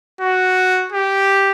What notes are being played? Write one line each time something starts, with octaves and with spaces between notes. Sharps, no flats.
F#4
G4